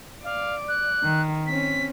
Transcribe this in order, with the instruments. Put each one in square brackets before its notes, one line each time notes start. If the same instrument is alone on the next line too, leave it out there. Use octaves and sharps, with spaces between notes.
[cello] D5 [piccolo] F5
[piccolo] F#6
[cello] D#3
[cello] C4 C#4 [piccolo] B6